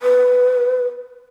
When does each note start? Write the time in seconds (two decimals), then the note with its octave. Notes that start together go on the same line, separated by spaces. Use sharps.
0.02 B4